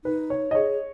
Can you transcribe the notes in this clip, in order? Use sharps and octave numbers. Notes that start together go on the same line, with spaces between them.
D#4 B4
C#5
D#5
G#4 C#5